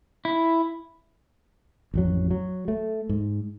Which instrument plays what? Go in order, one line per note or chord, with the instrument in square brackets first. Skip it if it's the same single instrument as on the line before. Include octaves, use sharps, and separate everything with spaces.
[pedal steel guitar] E4
[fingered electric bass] A1 F2 F#3
F#3
A3
G#2